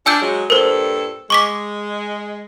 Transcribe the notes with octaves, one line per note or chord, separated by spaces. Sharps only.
D4 F4 G#5 E6 G6
F#3 G#3
G2 A#2 A4 A#4 C5
G#3 C#6 D6 B6